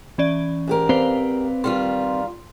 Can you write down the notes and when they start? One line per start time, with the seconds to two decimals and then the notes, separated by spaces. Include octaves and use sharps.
0.18 E3 C#4 D5
0.67 G#2 G4 A#4
0.89 C4 B4 C5 D5 F5
1.64 D#3 G3 F4 C6